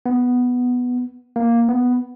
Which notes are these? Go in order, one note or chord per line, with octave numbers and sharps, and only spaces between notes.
B3
A#3
B3